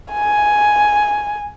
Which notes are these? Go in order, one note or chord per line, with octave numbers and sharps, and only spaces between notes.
G#5